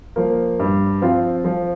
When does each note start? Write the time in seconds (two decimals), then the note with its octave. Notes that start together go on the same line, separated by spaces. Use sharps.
0.16 F3 A#3
0.60 G2
1.02 F3 C4 F4
1.45 F3